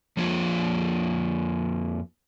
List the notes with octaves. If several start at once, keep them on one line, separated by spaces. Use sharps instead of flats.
F2 F3 A#3 F4 C#5